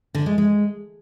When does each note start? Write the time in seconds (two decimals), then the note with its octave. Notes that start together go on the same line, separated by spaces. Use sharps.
0.15 D3
0.26 G#3
0.38 G#3